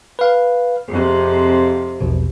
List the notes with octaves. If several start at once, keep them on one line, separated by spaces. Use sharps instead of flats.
B4 F5
F2 C3 G#4
A#1 E2 B2